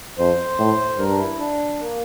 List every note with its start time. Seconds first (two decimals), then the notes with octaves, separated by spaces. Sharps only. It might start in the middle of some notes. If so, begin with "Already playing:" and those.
0.19 F2 C5
0.59 A2
0.98 G2 A#4
1.09 D4
1.19 E4
1.38 D4
1.79 A#3